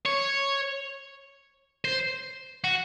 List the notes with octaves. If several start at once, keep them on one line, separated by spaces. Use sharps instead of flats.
C#5
C5
F#4